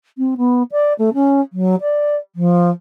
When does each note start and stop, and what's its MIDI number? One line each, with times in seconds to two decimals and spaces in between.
0.18 0.35 60
0.37 0.63 59
0.71 0.93 74
0.98 1.09 57
1.14 1.41 61
1.53 1.75 54
1.81 2.16 74
2.35 2.70 53